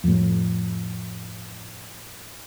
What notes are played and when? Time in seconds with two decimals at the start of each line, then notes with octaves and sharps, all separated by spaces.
0.04 F2 A2